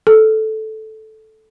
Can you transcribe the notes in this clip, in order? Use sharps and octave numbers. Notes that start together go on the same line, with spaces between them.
A4